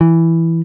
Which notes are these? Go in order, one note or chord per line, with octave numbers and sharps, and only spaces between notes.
E3